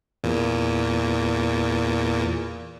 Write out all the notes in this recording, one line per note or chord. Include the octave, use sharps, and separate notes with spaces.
E2 A#2